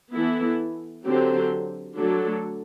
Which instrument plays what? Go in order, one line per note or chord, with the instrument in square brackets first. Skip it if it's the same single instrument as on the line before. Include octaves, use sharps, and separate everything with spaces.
[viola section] E3 B3 E4 A4
D3 F#3 C4 G4 C5
D3 F#3 A3 D4 A4